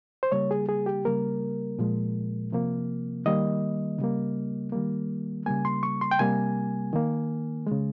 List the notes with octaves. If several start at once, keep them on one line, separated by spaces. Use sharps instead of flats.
C5
C#3 G3 A#3 C#5
G#4
G#4
G4
C#3 G3 A#3 A#4
A#2 F3 G#3
C3 F3 A#3
D#3 G3 A#3 D#5
C#3 G3 A#3
D#3 G3 A#3
C#3 G3 A#3 G#5
C6
C#6
C6
G5
C3 G3 A#3 G#5
D#3 A#3
C#3 G#3